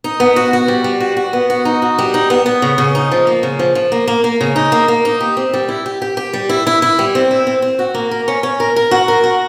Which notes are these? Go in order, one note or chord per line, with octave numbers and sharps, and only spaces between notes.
D#4
B3
F#4
F#4
G3
G3
F#4
F#4
B3
F#4
D#4
F#4
G3
D#4
B3
B3
C#3
C#3
D#4
F3
A#3
C#3
F3
F3
A#3
A#3
A#3
C#3
D#4
A#3
A#3
D#4
G4
C4
G3
E4
G4
G4
G4
G3
E4
E4
E4
G3
C4
E4
C4
C4
F#4
A#3
A#4
C#4
C#4
A#4
A#4
F#4
A#4
F#4